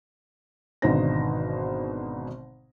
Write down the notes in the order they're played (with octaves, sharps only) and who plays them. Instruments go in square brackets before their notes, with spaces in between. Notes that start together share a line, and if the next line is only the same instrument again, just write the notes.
[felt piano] G#1 B2 D3 D#4 C5 A#6